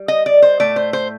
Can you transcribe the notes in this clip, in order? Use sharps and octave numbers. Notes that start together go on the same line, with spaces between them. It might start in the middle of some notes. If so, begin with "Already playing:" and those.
Already playing: G3
D#5
D5
C5
A2 A3 D5
C5
C5